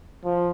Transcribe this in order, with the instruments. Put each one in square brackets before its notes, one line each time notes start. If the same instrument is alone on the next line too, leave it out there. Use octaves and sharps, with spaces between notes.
[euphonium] F3